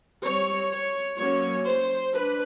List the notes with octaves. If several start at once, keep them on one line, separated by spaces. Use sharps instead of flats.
G3 C4 C#5
C#5
F#3 A#3 C#4 C#5
C5
D4 B4